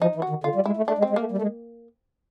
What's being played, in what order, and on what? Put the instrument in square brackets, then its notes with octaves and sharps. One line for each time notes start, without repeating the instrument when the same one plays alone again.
[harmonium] F3 [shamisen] D#4
[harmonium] E3
[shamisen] F#4
[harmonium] D#3
[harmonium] D3 [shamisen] F4
[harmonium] G3
[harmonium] G#3 [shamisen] E4
[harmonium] A3
[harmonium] A3 [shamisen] D4
[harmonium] G#3
[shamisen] C4
[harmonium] G#3
[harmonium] A3 [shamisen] A#3
[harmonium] G3
A3
G#3